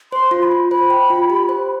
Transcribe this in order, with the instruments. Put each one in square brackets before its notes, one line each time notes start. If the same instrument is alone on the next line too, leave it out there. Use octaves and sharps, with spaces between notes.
[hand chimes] C5 [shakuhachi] C6
[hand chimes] F4
[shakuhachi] C6
B5
[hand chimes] F4
[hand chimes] C5 [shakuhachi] B5
[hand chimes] G5
F4
G4
C5